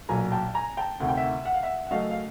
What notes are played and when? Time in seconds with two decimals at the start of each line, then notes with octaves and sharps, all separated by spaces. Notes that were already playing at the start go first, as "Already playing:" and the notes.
0.09 B1 A#2 F#3 G#5 A#5
0.32 G5 A5
0.54 G#5 A#5
0.77 G5 A5
1.00 D2 C3 D#3 F#5
1.08 G5
1.17 E5 F#5
1.45 F#5
1.54 F5
1.63 E5 F#5
1.87 F#5
1.90 F#2 C#3 F#3 A3 D#5 F5
2.10 F5